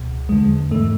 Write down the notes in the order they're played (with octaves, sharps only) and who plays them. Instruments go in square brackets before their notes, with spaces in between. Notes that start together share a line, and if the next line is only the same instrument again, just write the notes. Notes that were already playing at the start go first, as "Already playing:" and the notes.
Already playing: [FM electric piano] C#2 B2
E2 D3 G#3
G#2 E3 A3